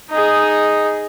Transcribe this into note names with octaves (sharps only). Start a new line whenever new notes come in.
D#4 G#4